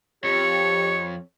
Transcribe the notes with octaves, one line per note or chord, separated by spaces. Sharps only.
F2 G4 C#5 C#7